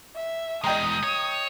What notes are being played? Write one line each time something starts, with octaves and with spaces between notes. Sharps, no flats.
E5
E2 G#3 D#5 G5 A#5 D#6
C#5